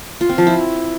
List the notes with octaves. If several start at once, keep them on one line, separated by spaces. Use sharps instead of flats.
F4
C4
F3
E4